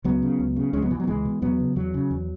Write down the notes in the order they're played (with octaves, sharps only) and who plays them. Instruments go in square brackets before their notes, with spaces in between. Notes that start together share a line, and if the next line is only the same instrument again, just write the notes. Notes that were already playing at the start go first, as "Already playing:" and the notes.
[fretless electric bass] C#2 F#3 B3
C#3
C#2
C#3
C#2 G#3 C#4
F#3 B3
B2 E3
F#3
B3
C#2 E3 G#3
B2
E2 F#3 B3
C#3
E2 F#3
C#3
E2